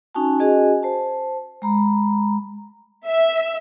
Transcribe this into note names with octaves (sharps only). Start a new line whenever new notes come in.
C#4 D#4 F#4 G#5 A5
C#4 F#4 G#4 D#5 G#5
C5 A5
G#3 A#5 B5
E5